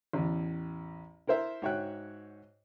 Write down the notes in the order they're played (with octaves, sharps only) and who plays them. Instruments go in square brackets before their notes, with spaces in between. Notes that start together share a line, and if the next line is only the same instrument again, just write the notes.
[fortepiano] A1 E2
E4 A#4 C5 E5
G#2 F#4 C#5 E5 G5 F#6